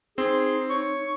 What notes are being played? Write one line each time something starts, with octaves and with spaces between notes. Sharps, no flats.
C4 D#4 G#4 C6
C#5 C#6